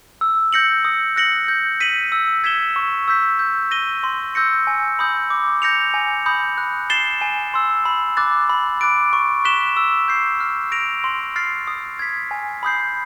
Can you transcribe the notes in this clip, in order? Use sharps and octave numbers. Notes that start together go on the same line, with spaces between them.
E6
G6 A#6 C#7 F#7
D#6
F#6 A#6 C#7 F#7
G6
B6 D#7 F#7
E6
G#6 B6 E7 G7
C#6
E6 G6 B6
G6
A#6 D#7 G7
C6
E6 G6 A#6 C#7
G#5
B5 D#6 G6
D6
G6 A#6 C#7 F7
G#5
B5 D#6 G6
F#6
A6 C7 E7 G7
G#5
C6 E6
B5
D6 F#6 A6
B5
D6 F#6 A6 D7
C#6
F#6 B6 E7 G7
E6
G6 C7
F6
A#6 D7 F7
C6
F6 A6 C7
D#6
G#6 B6
G#5
B5 D#6 G6 C7